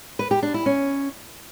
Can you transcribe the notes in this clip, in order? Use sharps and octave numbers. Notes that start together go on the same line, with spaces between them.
B4
G4
D4
E4
C#4